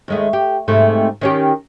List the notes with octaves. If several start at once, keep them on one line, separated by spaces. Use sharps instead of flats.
D#2 G#3 A3
G4
G#2 C3 A3
D#3 C#4 G4